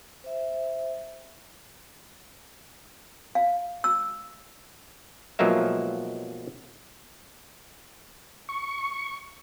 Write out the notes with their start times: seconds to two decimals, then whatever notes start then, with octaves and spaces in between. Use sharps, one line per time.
0.24 C5 E5
3.35 F5
3.84 E6
5.39 B1 F3 F#3 G#3 A#3 E5
8.49 C#6